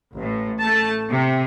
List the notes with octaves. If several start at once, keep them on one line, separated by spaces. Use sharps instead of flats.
A1 A2
A3 A5
C3